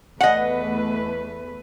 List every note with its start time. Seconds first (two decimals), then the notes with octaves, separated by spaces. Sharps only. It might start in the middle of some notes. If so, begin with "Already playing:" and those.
0.21 E2 A3 B4 D#5 F#5